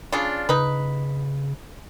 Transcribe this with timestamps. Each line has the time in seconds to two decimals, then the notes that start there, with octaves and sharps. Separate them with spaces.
0.12 C#3 D4 F4
0.49 C#3 D#4 B4